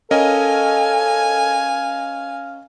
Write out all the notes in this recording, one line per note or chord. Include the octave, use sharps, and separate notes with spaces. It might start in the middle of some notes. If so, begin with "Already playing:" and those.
C#4 A4 A#4 D#5 F5 G#5